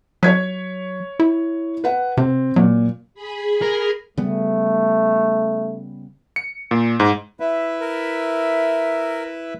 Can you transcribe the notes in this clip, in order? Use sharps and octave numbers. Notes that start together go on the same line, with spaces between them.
F#3 C#5 G#6 B6
E4
B4 F#5
C3 C4
A#2 F#3
G#4 B5
A#4
C#3 G3 A3 B3
C#7
A#2
G#2
E4 B4 E5
A#4